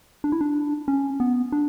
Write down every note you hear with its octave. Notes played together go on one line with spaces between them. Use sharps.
D4
E4
D4
C#4
B3
D4